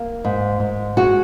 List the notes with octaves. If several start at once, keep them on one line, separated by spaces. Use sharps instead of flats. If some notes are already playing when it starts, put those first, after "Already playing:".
Already playing: A#3
G#2
G#2
G#3 F#4